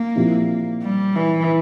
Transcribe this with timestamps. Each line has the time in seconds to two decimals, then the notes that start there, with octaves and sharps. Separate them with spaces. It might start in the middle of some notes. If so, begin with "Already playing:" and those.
Already playing: A#3
0.15 A#2 F3 C4 E4 G4
0.82 G3
1.15 E3